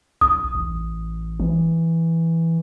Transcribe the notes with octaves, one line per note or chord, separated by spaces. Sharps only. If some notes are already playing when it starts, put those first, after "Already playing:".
B1 D#6
A1
E3